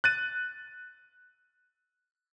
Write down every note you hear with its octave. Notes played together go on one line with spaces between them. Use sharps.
F#6 A6 D#7